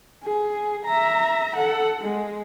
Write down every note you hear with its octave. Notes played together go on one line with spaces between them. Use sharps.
G#4
E5 A#5
A4 F#5
G#3